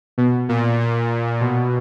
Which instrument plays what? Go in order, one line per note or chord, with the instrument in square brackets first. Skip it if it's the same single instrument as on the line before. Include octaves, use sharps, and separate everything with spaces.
[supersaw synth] B2
A#2
A#2
B2